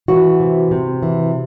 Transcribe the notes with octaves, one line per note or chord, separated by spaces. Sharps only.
E3 F#4
C3
C3
E3